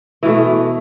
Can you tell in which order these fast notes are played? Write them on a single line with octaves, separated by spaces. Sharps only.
E3 B2 A3